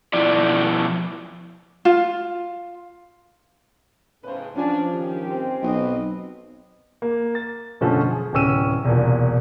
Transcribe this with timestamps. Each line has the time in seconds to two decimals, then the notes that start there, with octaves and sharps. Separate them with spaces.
0.13 B2 F3 E4 D5
1.85 F4
4.23 B1 A2 C#3 B4 C5
4.56 F3 C#4 D4 F4 G#5
4.93 D#3 G4
5.28 C4
5.62 B1 B4 D#5
7.02 A#3
7.35 A6
7.81 F#2 B2 D3 F3 A3 C#4
8.10 G#4
8.33 D1 C3 B3 C#4 E6 D#7
8.85 E1 C2 A#2